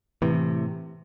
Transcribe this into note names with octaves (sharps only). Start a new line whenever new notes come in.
A2 C3 E3